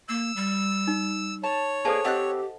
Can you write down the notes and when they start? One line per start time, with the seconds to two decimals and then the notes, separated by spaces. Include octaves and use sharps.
0.09 A#3 E6
0.36 G3
0.87 D#4
1.44 C#5 A5
1.85 A#3 D4 G#4 A4 C5 A5
2.05 C4 G4 D#5 F5 F#5 F#6